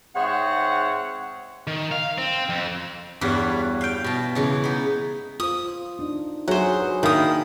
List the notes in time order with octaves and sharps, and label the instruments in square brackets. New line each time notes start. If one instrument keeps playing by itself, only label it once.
[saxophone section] G#2 C4 G#4 C#5 E5 F#5
[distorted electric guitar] D#3
F5
C4
F2
[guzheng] E2 G2 F#4 B4 C#5 F5
F5 G5
B2 A5
C#3 E3 G#3
B3 D#4
[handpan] F4 C5 [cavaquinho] D#6
[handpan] D4 D#4
[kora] F#3 [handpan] G#4 E5 [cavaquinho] C5 F#5
[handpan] B4
[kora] D#3 F5 [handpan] A#3 D4 [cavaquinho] E4 D#6